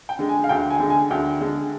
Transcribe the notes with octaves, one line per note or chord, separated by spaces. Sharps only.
G5
D3 G#3
G#5
F5
D2 G5
G#5
D3 G#3
G#5
D2 G5
D3 G#3